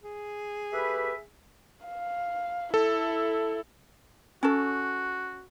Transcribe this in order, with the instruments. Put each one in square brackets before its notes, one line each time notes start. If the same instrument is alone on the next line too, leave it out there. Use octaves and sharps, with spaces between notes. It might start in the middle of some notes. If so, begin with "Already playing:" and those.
[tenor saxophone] G#4
[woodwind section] A3 G4 B4 [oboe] E5
[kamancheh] F5
[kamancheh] E4 [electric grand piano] A4
[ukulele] C#4 A4 [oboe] F#4